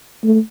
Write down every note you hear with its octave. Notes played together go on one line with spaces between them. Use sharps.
A3